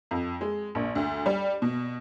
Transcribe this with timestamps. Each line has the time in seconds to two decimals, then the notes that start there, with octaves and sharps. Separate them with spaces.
0.11 F2
0.41 G#3
0.75 A#1
0.95 D2
1.26 G3
1.62 B2